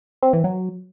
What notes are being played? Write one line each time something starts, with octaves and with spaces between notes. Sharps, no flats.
C4
E3
F#3